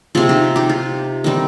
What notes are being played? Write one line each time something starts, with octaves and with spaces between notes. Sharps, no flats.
C3 F3 C4 F4 G#4
D#4 G4
D#4 G4
F4
D#3 G3 C4 D#4